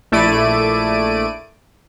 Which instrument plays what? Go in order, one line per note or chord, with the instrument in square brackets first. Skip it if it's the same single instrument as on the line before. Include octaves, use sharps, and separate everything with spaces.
[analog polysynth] A#1 A3 E4 D5 D7 D#7